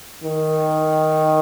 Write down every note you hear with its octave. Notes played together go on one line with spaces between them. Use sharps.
D#3